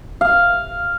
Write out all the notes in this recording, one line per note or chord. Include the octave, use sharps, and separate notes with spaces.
F5